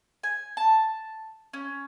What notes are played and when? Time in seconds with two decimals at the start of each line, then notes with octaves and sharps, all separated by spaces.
0.23 G#5
0.57 A5
1.53 C#4